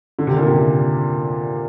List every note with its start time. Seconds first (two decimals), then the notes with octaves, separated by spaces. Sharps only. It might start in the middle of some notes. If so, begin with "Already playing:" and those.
0.19 D3
0.27 C3
0.37 A#2
0.47 C3